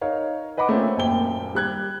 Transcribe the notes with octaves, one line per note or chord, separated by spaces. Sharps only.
D#4 A#4 C#5 F5
B4 D#5 F#5 B5 D6
A3 A#3 C4 C#4 F4
D#1 F#2 A#2 G5 G7
G3 F#6 G#6